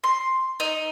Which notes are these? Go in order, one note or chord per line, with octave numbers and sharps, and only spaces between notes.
C6
D#4